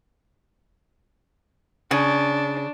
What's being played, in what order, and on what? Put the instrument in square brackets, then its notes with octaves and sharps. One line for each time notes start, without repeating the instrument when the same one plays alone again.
[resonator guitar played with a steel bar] C#3 [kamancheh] D4